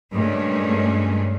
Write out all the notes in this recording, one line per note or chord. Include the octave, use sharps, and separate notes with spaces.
G2 A#2 C#3 G#3 A3 C#4